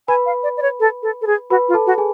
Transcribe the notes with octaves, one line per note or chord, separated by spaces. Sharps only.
B4 G#5 B5
F5
D5
D5
C#5
A4
A4
A4
G#4
F#4 B4 B5
F4
A4 A5
F#4
G#4 G#5